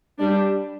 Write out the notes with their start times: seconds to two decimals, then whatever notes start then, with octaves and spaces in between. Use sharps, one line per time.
0.18 G3 D4